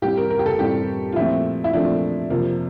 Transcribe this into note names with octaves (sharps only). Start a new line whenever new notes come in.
A2 G3 C4 G4
A#4
A#4
G4
A4
A2 G3 C4 G4
F4
A#2 F3 A3 C4 E4
E4
A#2 F3 A3 C4 D4
F2 C3 F3 A#3